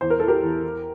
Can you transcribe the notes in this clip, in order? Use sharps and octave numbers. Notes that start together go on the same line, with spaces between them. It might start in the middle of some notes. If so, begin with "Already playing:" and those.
E2 C5
A#4
E3 A4
G4 A#4
E2
E3